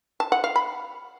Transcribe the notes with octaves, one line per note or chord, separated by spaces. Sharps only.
A5
F#5
F5
B5